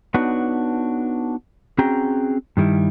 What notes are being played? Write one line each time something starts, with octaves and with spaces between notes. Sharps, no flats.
B3 D4 D#4 F#4 B4 C#5
C4 C#4 F#4 G#4 G5 A#5
G2 D#3 G3 E4